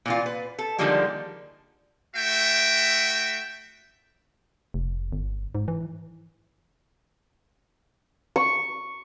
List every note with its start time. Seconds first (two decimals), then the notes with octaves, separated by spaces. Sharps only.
0.06 A#2 E3 F4
0.26 B4
0.59 A4
0.78 D3 D#3 F3 G3 G#3 A#3
2.15 A3 F#4 E5 G5
4.74 F1
5.13 G1
5.55 G#2
5.68 E3
8.36 C#6